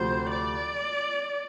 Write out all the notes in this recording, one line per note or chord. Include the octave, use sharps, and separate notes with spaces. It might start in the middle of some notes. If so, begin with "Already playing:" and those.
Already playing: D2 C3 F3 C5
D5